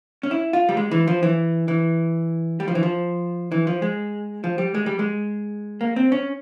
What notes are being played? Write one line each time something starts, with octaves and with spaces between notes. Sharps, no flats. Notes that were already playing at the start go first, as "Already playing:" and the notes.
C#4
E4
F4
G3
G#3
E3
F3
E3
E3
G3
F3
E3
F3
E3
F3
G#3
F3
G3
G#3
G3
G#3
A#3
C4
C#4